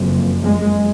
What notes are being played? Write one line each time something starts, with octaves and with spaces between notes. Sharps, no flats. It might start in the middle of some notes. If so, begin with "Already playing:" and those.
Already playing: F#1 F2
G#3